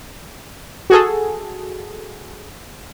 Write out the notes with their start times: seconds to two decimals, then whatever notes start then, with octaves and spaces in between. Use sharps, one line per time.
0.90 F#4 G#4 A4